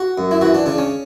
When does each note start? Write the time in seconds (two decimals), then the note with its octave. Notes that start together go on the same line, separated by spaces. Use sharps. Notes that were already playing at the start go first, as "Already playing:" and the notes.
Already playing: F#4
0.18 F#2
0.31 E4
0.41 E3 F#4
0.54 D4
0.66 C#3 D4
0.78 C#4